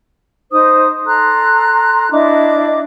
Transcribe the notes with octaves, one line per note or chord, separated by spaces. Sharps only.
D#4 C5 D#6
A4 A#5 C6 F#6
D4 E4 D#5 D6